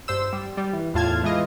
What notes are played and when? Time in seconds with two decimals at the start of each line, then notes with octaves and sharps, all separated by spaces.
0.08 G2 C5 E6
0.33 G3
0.57 G3
0.73 E3
0.94 E2 A2 F4 A5 F6 G#6
1.24 E3 G#3 F4 D#5